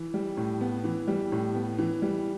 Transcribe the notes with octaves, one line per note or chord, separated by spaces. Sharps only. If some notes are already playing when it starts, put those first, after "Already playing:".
Already playing: E3
G3
A2
B3
E3
G3
A2
B3
E3
G3